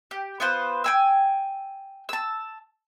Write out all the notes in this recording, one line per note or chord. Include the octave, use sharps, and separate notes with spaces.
G4
B3 F4 B4 C5
G5 G#5 E6
A5 E6